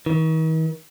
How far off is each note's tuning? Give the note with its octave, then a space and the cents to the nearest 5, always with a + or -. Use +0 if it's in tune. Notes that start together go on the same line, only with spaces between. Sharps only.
D#3 +45